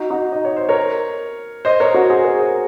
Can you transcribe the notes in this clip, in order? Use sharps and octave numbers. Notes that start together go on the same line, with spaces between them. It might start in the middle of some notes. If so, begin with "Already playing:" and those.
Already playing: D#4 F#4
D#4 F#4
D#5
C#5
C5
A#4 C#5
C5 D#5
A#4 C#5
F#4 A#4
G#4 C5
A#4 C#5
G#4 C5